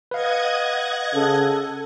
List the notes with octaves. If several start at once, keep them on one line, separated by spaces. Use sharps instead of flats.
B4 D#5 F5 F#5 G#6
C#3 A4